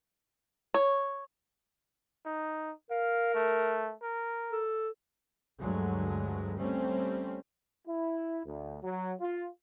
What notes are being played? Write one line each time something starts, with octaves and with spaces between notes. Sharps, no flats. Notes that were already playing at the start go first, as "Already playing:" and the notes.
C#5
D#4
A#4 F5
A3
A#4
A4
D2 G2 D3 F#3 G#3
G3 A3 C4 C#4
E4
D2
F#3
F4